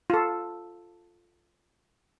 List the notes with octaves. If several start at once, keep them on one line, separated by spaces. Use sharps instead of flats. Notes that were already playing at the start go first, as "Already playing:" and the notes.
F4 A4